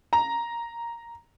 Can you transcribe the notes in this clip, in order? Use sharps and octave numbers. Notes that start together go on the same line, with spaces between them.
A#5